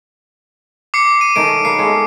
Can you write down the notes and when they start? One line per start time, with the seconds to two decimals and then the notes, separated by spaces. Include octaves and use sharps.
0.94 D6 C7 C#7
1.21 D#7
1.36 D#3 A3 C#4 D7
1.65 A#3 B3 C7
1.78 G#3 C#4 A4